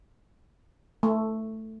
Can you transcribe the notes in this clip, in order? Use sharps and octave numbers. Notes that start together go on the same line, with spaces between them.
A3